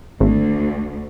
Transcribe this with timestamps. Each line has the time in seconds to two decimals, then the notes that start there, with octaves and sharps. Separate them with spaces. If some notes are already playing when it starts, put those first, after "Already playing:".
0.20 G#1 D2